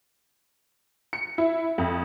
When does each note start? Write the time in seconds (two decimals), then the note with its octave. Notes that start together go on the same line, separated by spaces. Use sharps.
1.13 C#7
1.38 E4
1.78 F2